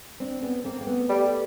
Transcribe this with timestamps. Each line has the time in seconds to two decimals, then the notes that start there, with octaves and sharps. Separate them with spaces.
0.20 C4 D4
0.42 B3 C#4
0.64 A#3 C4
0.81 A#3
0.87 A3 B3
1.09 G3